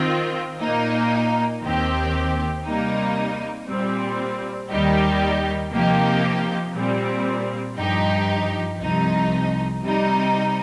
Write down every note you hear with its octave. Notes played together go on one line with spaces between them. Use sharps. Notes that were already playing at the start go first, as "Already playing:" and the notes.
Already playing: D#3 C4 F4
A#2 A#3 D#4
D#2 D#3 C4 G4
C3 G3 A#3 D#4
A#2 G3 C4
D#2 D#3 G3 D#4 G4
C3 F3 A#3 D#4 G4
A#2 G3 C4
G2 F3 D#4 G4
C2 C3 F3 D#4
C3 G3 D#4